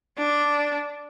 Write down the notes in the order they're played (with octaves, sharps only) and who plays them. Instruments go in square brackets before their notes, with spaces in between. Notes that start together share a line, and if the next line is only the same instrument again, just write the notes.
[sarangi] D4